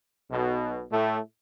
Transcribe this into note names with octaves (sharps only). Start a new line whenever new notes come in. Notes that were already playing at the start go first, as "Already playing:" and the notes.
B1 B2
A2 A3